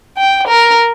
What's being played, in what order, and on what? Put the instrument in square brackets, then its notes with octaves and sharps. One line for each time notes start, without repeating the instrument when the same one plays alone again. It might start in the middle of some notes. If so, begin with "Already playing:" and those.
[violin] G5
A#4